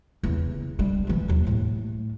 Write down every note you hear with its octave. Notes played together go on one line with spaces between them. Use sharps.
E2 C#3
G3 D4
D2 E3
D#2 F#3
A2 A3